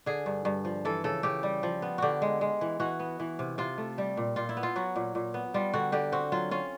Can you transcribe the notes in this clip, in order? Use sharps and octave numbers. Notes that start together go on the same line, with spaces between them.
D3 G#4
G2
G2
F3
E3 A4
C#3 A4
C#3 G4
G3
F3
B3
D3 F#4 G4
G#3
G#3
E3
E3 F#4
B3
E3
C3
C3 F4
A3
G3
A#2
A#2 F4
E4
B3
F4
F#3 F#4
A#2
A#2
B3
G3 F4
D3 F#4
D3 G4
C4 F#4
F#3 F4
C#4 F4